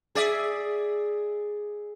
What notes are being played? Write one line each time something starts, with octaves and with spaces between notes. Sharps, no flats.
G#4 D5 E5